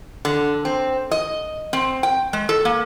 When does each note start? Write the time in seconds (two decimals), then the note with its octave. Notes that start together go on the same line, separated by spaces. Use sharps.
0.25 D3
0.65 C4
1.11 D#5
1.73 C4
2.03 G5
2.33 G#3
2.49 A4
2.65 A#3